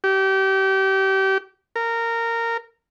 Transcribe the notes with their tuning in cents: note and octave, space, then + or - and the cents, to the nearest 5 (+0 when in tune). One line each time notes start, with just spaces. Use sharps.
G4 -30
A#4 -15